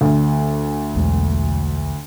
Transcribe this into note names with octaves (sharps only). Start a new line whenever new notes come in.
D2
B1 E2 G#3